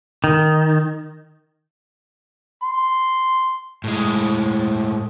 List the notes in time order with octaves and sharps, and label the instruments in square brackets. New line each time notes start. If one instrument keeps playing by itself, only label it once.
[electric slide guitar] D#3
[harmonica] C6
[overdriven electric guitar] A2 G#3